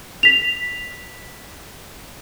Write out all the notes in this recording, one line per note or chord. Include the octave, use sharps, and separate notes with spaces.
B6 F7